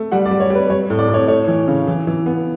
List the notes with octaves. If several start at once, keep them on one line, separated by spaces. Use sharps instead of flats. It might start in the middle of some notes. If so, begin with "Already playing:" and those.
Already playing: A3
G3 F#5
D5
G3
C#5
G3 B4
G3 C#5
A2
D5
A2
C#5
A3 C#5
E3
C#3
E3
E3
B3